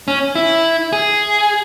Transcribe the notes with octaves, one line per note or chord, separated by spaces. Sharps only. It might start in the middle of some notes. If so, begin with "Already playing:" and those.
C#4
E4
G#4